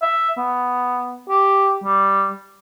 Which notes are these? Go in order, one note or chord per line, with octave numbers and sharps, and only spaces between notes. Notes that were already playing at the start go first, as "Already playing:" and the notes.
E5
B3
G4
G3